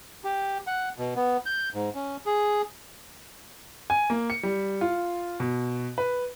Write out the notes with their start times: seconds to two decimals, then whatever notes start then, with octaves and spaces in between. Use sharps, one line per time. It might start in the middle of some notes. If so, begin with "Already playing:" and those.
0.24 G4
0.67 F#5
0.98 B2
1.16 B3
1.46 G6
1.74 G#2
1.95 C#4
2.26 G#4
3.90 G#5
4.10 A#3
4.30 C#7
4.43 G3
4.81 F4
5.40 B2
5.98 B4